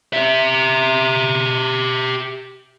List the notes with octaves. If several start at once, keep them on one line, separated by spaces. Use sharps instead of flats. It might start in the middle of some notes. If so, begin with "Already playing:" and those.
G4 E5